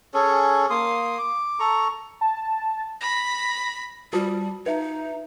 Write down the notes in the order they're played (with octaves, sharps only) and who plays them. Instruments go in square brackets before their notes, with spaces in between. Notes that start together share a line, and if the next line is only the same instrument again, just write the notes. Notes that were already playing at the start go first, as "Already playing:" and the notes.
[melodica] C#4 G#4 A4 C#5
A#3 C6 D#6
D6
A4 A#5 C#6
[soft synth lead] A5
[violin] B5 [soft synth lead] A#6
[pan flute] G3 [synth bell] F4 F#4 A5
[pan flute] D#4 [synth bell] B4 E5